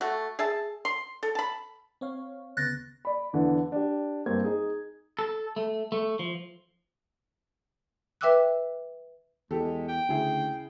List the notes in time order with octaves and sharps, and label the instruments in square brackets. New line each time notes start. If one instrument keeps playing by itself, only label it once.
[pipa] A3 F#4
G#4 E5 A5
C6
A4
A5 B5
[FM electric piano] C4 C#5 F5
[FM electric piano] D2 C#3 B3 [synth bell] F#6 A6 A#6
[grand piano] D5 B5
E2 D3 E3
D4 G4
G2 A#3 C4 G#6
D#4 G#4
[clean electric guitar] A4
A3
A3
F3
[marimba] B4 E5 G5 D6 E6 F#6
[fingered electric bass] E2 [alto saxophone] G#3 [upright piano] G4 A4
[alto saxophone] G5
[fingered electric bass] D2 [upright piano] C#3 E4 G#4